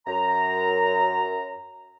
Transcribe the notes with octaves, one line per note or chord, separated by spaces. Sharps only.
F#2 A#5